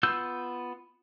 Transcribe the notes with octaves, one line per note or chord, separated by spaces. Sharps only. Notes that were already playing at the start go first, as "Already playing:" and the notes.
B3 F4 E6 G6